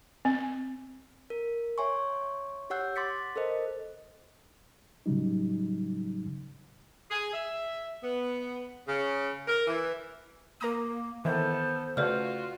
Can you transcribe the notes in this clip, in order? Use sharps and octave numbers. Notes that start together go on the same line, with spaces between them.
C4
A#4
C#5 E5 G#5 C6 C#6
G4 C#5 F#5 E6 F#6 G6
C6 D6 A6 B6 C#7
A4 A#4 C5 D#5
A2 C#3 F#3 G3 D#4
G#4
E5
B3
C#3
A#4
E3
A#3 A#4 A#5 D#6
D#3 E3 B3 E4 A4 C5
C#3 A3 F4 F#4 B4 D5 E5 F6